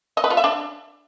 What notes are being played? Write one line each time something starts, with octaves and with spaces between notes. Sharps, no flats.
D#5
B4
F4
E5
D4